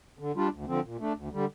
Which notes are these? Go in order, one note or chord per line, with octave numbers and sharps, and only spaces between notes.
D3
G3 D4 F4
D2
D3 F3 C4
A#2
A3 D4
D2
D3 G3